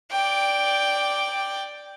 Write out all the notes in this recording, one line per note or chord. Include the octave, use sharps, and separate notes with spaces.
D5 G5